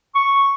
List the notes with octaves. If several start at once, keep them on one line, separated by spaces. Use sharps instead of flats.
C#6